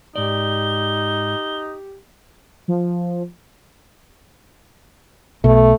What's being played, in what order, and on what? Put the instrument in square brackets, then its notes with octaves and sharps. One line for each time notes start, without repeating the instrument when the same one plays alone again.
[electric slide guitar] G#2 D5 [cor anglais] D#4 [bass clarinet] G4 [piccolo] G7
[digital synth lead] F3
[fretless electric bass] B1 B2 [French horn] A3